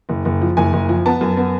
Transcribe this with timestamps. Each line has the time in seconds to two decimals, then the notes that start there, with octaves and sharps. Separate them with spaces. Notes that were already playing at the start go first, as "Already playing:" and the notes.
0.09 F#1
0.25 F#1
0.41 F3
0.57 F#1 G#5
0.73 F#1
0.89 F3
1.06 B3 A5
1.21 F#2
1.37 B3